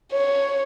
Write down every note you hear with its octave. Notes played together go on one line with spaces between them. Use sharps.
C#5